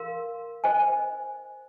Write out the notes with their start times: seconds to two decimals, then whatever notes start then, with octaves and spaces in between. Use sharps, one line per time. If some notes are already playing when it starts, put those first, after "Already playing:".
Already playing: A#4 F5 C6
0.64 C5 D#5 G#5